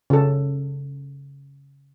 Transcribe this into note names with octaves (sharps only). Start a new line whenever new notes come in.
C#3 A4